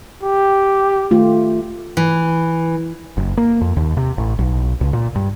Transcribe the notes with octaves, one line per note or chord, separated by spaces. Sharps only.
G4
D#3 A3 F4
E3
F#1
A#3
F2
D#2
C3
A1
B1
C#2
A#2
G2